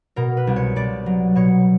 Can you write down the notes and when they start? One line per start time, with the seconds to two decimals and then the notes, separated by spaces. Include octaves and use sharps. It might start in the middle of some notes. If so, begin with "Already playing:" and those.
0.16 B2 A#4
0.37 B4
0.47 C2
0.56 C#5
0.76 C2 D5
1.06 F#3
1.36 B2 C#5